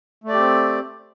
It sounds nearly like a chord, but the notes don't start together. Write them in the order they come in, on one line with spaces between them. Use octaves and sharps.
A3 D5 G4 C4